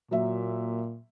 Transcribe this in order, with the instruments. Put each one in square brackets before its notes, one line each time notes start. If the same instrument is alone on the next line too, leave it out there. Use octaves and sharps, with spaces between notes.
[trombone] A#2 [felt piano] F#3 A#3 E5